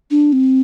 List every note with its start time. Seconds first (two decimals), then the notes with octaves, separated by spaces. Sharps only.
0.11 D4
0.33 C4